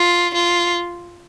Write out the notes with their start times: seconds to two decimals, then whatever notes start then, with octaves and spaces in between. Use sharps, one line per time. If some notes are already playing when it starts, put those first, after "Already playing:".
Already playing: F4
0.34 F4